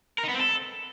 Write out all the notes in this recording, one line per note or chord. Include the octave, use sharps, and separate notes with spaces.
A#4
D#4
B3
C4
A4